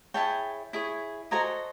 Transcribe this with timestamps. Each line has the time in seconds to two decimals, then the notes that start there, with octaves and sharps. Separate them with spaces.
0.14 E4 G#4 C#5 G5 A5
0.73 E4 G#4 C#5
1.31 F#4 A4 C5 D#5 G#5 A#5